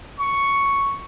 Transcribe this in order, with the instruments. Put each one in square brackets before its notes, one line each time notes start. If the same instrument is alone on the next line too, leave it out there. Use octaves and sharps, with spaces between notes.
[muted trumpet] C#6